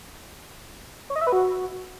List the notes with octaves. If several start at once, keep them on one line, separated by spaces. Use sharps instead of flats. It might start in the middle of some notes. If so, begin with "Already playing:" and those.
C#5
D#5
E5
B4
F#4